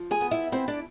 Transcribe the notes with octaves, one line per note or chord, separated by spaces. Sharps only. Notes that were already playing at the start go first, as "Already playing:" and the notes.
Already playing: F3
G#4 G#5
B3
E4 E5
C4 E4 C5
D4 D5